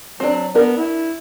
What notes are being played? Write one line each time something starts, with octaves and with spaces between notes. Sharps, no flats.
F#3 C4 D4
B3 D4 A#4
E4